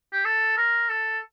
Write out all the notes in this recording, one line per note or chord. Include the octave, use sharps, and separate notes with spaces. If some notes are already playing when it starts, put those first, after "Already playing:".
G4
A4
A#4
A4